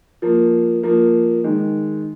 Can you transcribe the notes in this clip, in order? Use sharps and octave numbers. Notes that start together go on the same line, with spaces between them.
F3 A#3
F3 A#3
D#3 G#3